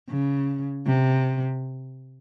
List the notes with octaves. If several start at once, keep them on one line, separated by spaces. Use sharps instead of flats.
C#3
C3